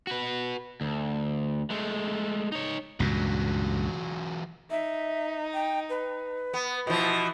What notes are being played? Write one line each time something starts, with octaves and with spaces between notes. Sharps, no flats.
F#4 B4
D2
G#3 A3
D#4 C#5
C#2 G2 A#2 E3 F#3
D#4 E5
G5
B4
B3
B2 E3 F3